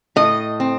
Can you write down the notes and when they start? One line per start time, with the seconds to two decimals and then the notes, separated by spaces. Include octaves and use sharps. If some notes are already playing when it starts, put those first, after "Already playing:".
0.16 A2 D#5
0.60 C4